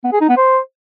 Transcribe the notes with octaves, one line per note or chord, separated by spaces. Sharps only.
B3
G#4
D#4
B3
C5